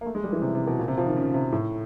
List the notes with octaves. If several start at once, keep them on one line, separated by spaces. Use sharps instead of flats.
A#3
A3
G#3
G3
E3
C3
C3
B2
A#2
C3
F3
D#3
C#3
C3
A2